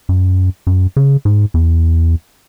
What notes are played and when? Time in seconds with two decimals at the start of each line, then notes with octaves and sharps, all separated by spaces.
0.09 F#2
0.67 F#2
0.97 C#3
1.25 G#2
1.54 E2